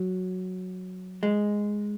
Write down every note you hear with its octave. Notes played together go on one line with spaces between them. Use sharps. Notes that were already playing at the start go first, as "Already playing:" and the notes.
Already playing: F#3
G#3